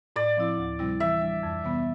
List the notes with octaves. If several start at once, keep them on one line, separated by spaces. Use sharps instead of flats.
A2 D5
F3 C4 E4
D2
C3 G3 C4 E4
E3 E5
G3 D4
F2
C3 E3 G3 B3